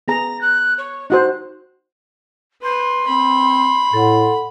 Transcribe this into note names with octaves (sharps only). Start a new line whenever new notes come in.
B3 G#4 A#5 A#6
F#6
C#5
D#4 F#4 C5 F#6
B4 C6
C4 B5
A2 A4 F#5